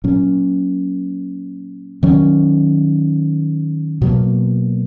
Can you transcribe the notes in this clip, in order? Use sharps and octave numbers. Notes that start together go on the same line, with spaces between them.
A#2 F#3 C#4
D#3 F#3 C#4
B2 F#3 A#3